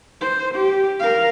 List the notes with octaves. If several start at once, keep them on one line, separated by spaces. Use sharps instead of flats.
C5
G4
A#4 F5